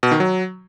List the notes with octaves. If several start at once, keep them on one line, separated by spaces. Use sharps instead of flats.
B2
D#3
F#3